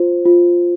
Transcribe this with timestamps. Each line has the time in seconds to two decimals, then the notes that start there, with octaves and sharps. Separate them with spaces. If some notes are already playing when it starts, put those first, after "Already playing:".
Already playing: F4 C5
0.26 F4